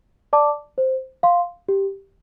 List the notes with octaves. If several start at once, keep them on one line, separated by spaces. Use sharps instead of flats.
D5 A5 D6
C5
F5 C6
G4